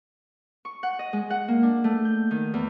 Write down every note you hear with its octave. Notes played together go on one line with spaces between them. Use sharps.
C#6
F#5
D#5
G#3
F#5
A#3
D4
A3
G6
D#3
E2